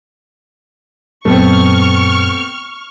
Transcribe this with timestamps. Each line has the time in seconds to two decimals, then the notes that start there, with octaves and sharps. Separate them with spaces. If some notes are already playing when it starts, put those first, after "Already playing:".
1.25 F#2 A#2 A3 B3 C4 C#6 F6